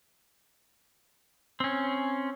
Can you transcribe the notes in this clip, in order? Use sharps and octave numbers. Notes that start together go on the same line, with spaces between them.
C4 C#4